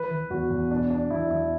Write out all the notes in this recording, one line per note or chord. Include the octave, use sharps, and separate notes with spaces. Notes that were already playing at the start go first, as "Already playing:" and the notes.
Already playing: E3 B4
E3
E2 F#4
E2
B2 D4
B2 D4
E2 E4
E2 E4